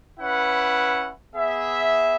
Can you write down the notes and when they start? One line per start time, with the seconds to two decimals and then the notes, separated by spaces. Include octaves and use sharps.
0.18 C#4 E4 B4 F#5
1.35 B3 G#4 E5